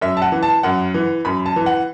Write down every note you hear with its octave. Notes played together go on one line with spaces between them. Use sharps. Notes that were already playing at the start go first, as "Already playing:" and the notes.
F#2 E5
A5
F#5
E3
A5
F#2 F#5
E3
F#2 B5
A5
E3
F#5